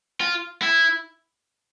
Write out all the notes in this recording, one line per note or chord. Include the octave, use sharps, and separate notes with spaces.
F4
E4